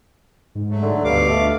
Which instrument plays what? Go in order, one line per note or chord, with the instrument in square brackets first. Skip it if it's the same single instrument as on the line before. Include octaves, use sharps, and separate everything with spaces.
[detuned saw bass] G#2
[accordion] F#3 A3
[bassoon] D3
[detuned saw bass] D2 [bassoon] G2 [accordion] B2 F5 D6
[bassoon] A3